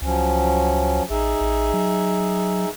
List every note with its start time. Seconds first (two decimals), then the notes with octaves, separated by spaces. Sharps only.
0.02 C#2 F3 F#3 C#4
1.10 A1 D#4 G#4 E5
1.41 A1
1.74 F#3